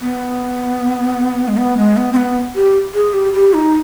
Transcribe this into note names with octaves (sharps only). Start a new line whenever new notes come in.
B3
G#3
B3
G#3
B3
C4
B3
G4
G#4
G4
G4
D#4